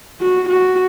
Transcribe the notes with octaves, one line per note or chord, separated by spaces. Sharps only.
F#4
F#4